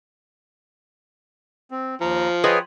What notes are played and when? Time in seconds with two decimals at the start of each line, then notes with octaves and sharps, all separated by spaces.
1.71 C4
2.01 D#2 F3 A#5
2.44 F4 G#4 B4 C#5 D#5 G5